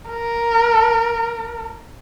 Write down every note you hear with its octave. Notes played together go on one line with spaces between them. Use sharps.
A#4